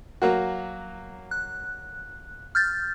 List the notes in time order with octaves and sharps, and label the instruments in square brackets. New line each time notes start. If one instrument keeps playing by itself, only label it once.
[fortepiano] F#3 A#3 F#4
[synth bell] F#6
F6 G6 A6